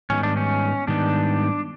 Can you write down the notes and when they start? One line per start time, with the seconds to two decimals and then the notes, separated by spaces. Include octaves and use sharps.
0.10 G#2 D#3 G3 B3 C#4 D#4
0.23 D4
0.37 C#4
0.87 G#2 D#3 G3 B3 D4 D#4